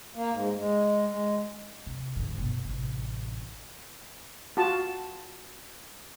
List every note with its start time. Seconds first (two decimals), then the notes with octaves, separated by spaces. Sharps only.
0.15 A#3
0.31 G#2
0.57 G#3
1.06 G#3
1.87 C3
2.16 G#2 D3
2.38 G1 B2
2.65 A1 C3
4.57 F4 F#4 A5